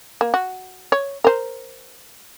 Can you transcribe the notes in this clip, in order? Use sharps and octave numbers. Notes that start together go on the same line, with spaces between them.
A#3
F#4
C#5
A#4 C5